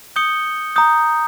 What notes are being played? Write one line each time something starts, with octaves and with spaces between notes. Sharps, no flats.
D#6 G6 C#7 G7
A#5 D#6 G6